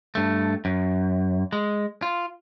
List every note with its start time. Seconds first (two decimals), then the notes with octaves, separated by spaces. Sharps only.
0.15 G2 A3
0.65 F#2
1.53 G#3
2.02 F4